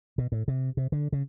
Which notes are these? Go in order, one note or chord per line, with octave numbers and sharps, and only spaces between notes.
B2
A2
C3
C3
D3
C#3